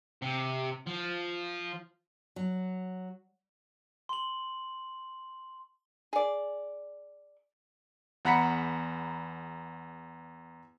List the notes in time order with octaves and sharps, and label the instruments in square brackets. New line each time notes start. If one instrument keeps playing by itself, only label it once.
[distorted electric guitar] C3
F3
[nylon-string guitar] F#3
[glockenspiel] C6 F#7
[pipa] G#4 D5
[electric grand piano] E2 F#5 A#5 B5 B6 C#7